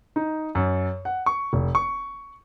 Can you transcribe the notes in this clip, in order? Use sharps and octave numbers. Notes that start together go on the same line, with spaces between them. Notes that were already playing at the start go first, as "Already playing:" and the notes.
D#4
F#2
F#5
C#6
F1
C#6